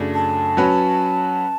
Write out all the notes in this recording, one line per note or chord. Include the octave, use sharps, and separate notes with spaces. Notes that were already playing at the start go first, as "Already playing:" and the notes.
Already playing: F#2 C#3 F#3 A3 D4
A5
F#3 C#4 F#4 B4